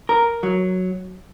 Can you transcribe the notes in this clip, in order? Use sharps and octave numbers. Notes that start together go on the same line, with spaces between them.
A#4
F#3